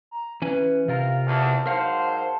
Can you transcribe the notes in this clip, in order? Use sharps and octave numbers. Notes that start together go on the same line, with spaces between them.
A#5
E3 C#4 B4 G#5
C3 F4 A#4 F5
E2 A5
G#2 F#3 A#4 C5 F5 F#5